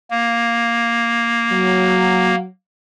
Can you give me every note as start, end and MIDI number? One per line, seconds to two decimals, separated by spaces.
0.11 2.35 58
1.52 2.47 54